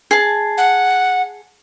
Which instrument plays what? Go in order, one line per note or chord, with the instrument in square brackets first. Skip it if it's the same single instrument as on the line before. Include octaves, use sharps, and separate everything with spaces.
[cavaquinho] G#4 A5
[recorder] F#5